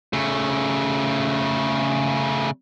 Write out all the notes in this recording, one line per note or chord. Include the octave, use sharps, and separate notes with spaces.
C#3 A3